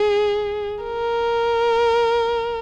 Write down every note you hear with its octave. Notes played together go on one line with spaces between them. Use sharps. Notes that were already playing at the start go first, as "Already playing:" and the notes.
Already playing: G#4
A#4